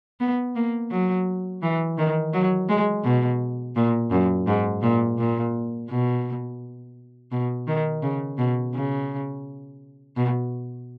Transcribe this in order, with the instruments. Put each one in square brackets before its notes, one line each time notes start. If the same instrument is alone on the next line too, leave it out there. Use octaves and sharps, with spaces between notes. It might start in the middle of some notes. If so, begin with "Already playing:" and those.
[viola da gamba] B3
A#3
F#3
E3
D#3
F#3
G#3
B2
A#2
F#2
G#2
A#2
A#2
B2
B2
D#3
C#3
B2
C#3
B2